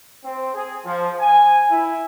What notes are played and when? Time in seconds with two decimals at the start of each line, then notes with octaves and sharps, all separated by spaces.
0.25 C4
0.55 G#4
0.85 F3
1.20 G#5
1.70 E4